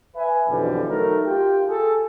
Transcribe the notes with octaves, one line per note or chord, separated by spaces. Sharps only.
B4 E5 G#5
B1 F2 B2 D3 E3 G3
F#3 A3 D#4 A#4
F4 G4 G5
G#4 A4